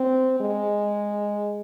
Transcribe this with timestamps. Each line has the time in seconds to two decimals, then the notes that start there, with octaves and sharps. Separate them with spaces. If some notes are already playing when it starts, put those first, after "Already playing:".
Already playing: C4
0.41 G#3